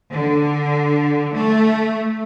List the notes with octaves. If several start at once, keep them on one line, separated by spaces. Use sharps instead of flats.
D3
A3